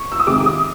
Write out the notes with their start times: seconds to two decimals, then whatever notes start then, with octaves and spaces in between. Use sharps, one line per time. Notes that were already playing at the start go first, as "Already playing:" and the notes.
Already playing: C#6
0.12 E6
0.19 D#6
0.27 C3 D#3 G#3 D6
0.40 D6
0.46 D#6